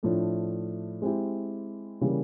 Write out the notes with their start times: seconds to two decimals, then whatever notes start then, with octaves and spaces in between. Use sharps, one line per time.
0.03 A2 F3 A3 D4
1.02 G#3 C4 E4 G4
2.01 C#3 E3 G3 A#3